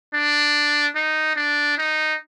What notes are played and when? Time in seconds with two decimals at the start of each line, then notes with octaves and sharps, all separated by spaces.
0.14 D4
0.95 D#4
1.36 D4
1.78 D#4